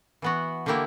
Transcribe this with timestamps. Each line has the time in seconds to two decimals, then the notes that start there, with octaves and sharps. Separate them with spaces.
0.22 E3 B3 F#4
0.66 D3 A#3 E4 G4